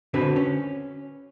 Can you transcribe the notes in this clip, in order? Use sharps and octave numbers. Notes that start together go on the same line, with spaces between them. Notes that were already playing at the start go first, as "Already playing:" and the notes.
D3 C4 F#4 B4
C#4